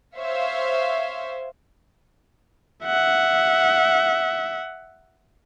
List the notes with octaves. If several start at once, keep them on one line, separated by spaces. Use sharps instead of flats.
C5 C#5 E5 F5
E5 F#5